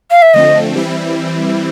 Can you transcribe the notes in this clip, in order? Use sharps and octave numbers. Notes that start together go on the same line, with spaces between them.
F5
E5
D3 F3 A3 C4 D#5
E3 G3 C4 E4